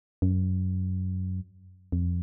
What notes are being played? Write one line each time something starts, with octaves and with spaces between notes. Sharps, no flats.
F#2
F2